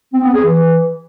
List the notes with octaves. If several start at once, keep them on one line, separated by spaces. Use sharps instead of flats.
C4
B3
G#4
E3